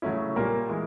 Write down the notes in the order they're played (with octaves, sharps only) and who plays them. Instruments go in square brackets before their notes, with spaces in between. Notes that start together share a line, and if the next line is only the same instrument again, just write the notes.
[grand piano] C#3 F#3 A3 C#4 E4
A#2 G3 A#3 A#4
E3 G#3